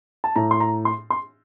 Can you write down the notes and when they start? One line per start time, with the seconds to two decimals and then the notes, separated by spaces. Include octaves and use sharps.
0.24 A5
0.36 A2 A#5
0.51 C6
0.60 A#5
0.85 C6
1.10 C6